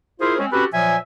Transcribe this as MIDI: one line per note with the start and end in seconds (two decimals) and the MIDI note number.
0.21 0.37 64
0.21 0.37 65
0.21 0.37 68
0.21 0.37 70
0.21 0.37 72
0.39 0.47 56
0.39 0.47 60
0.39 0.47 61
0.52 0.65 60
0.52 0.65 61
0.52 0.65 66
0.52 0.65 67
0.52 0.65 69
0.52 0.65 71
0.73 0.97 46
0.73 0.97 53
0.73 0.97 54
0.73 0.97 76
0.73 0.97 80